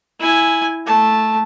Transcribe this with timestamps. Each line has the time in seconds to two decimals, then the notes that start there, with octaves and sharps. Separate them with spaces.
0.20 E4 G#5
0.86 A3 A5